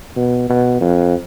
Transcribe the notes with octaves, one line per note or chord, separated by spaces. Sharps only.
B2
B2
F2